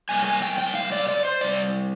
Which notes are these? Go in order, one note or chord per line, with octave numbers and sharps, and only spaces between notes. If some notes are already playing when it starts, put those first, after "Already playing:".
C3 G3 A#3 G#5
G#5
G5
G5
F5
D5
D5
C5
C3 G3 D5